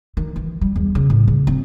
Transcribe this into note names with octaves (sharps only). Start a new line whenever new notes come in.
D#3
E3
G3
E2
C#3
A2
C#3
C4